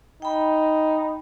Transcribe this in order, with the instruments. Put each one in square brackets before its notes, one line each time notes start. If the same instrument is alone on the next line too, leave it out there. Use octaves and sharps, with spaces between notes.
[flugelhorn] D#4 [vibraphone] G5 B5